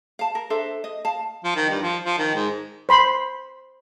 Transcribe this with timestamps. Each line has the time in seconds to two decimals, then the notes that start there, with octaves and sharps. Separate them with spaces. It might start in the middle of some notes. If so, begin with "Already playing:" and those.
0.19 F5 A5
0.35 A#4
0.50 D4 A4 C5 E5
0.84 D#5
1.05 F5 A5
1.44 F3
1.56 D#3
1.69 G2
1.82 F3
2.05 F3
2.18 D#3
2.35 G#2
2.89 C5 B5 C6